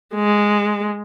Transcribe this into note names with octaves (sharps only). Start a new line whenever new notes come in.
G#3